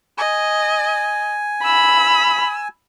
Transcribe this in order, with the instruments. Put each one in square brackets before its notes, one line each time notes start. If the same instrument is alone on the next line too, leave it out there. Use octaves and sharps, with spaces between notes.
[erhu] D#5 [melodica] G#5
[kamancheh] B5 [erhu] E6